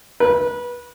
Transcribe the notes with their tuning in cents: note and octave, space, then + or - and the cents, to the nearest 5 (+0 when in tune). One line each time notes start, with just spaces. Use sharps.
B4 -25